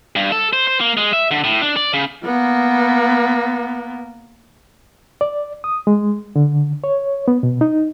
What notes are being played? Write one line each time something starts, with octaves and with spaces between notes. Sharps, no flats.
G2
A4
C5
C5
A#3
G#3
E5
D3
A2
D4
D5
C#3
A#3 B3
D5
D#6
G#3
D3
C#5
B3
B2
D#4